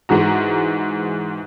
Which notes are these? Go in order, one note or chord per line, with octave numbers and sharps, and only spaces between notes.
G#2 E3 F#4 A#5